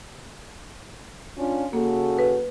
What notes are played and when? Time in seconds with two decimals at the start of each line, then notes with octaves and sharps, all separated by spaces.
1.38 C#4 D4 F4
1.73 C#3 A#3 F#4 A4
2.19 B4